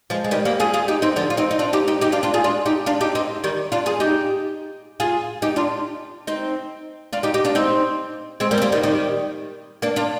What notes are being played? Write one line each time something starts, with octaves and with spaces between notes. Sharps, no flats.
F3 G#3
G#3
D#3 G3
G3 A#3
F4 G#4
F4 G#4
D#4 G4
C4 D#4
D3 F3
F4
C4 D#4
D#4
D4 F4
D#4 G4
D#4 G4
D#4 G4
D4 F4
D4 F4
F4 G#4
D4 F4
D#4 G4
D4 F4
D#4 G4
C4 D#4
D#3 G3
D4 F4
F4 G#4
D#4 G4
F4 G#4
D#4 G4
D4 F4
C4 D#4
D4 F4
D#4 G4
D#4 G4
D4 F4
C4 D#4
G#3 C4
G3 A#3
C4
G3 A#3
D#3 G3
D#3 G3
A#3 D4
D4 F4